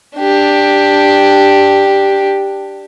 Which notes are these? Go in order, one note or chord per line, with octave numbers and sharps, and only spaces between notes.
D4 G4